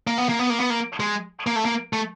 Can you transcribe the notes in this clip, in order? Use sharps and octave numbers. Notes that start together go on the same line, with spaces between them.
A#3
B3
A#3
B3
A#3
B3
A#3
G#3
A#3
A3
A#3
A3